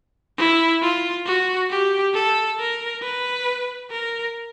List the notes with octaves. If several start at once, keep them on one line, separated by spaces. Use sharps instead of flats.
E4
F4
F#4
G4
A4
A#4
B4
A#4